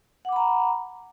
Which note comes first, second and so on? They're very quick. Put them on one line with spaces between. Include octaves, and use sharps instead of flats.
F#5 D6 B5 A#5